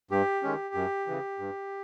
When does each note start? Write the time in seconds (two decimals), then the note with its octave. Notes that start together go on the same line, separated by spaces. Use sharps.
0.11 G2 G4
0.43 D#3 G#3 C#4
0.75 F#2
1.07 C#3 E3
1.39 G2